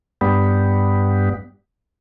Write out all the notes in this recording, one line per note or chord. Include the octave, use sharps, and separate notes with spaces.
G2 G3 B3